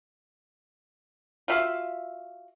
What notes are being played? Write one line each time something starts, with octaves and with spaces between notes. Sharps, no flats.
F4 F#4 E5 F5